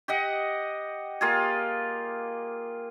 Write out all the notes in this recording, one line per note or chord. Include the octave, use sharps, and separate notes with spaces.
G4 D#5 F#5
A#3 F4 G4 G#4